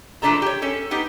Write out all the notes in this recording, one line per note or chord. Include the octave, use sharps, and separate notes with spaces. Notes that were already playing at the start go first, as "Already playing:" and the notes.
E3 F3 A3 D4 A4 A#5
G4 C#5
C#4 A4
B3 D#4 G4